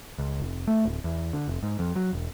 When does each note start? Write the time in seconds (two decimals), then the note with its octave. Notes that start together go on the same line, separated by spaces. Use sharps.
0.18 C#2
0.40 F1
0.67 A3
0.85 D1
1.04 E2
1.33 D3
1.48 F1
1.63 G#2
1.79 F2
1.96 F#3
2.13 E1